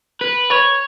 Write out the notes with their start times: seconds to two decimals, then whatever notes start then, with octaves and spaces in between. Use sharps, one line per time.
0.21 B4
0.50 C#5